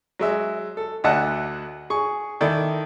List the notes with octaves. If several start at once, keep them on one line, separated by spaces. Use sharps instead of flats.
F#3 G#3 E5
A4
D2 D3 D#5 E5 F#5 A5
G#4 C#6
D#3 E4 A4 D5